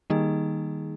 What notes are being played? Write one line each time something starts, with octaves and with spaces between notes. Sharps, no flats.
D#3 G3 A#3 D#4 G#4